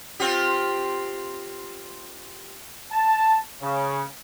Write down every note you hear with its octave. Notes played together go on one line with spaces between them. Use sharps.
C4 F4 G4
A5
C#3